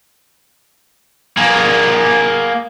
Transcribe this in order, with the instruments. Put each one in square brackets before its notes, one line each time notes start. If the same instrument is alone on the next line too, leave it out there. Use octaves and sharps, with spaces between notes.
[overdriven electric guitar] A#3 G#4